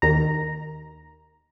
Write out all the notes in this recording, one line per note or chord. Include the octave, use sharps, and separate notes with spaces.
D#2 D#3 A#5